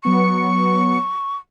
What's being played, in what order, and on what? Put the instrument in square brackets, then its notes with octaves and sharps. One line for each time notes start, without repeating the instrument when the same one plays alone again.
[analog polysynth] F#3 B3 C#7 [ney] C#6